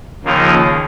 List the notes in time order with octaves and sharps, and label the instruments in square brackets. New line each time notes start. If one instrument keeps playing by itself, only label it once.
[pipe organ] D#2 C#3 F3 A#3 D#4